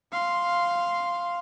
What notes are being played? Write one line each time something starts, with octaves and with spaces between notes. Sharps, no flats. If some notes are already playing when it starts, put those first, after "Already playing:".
F5 C6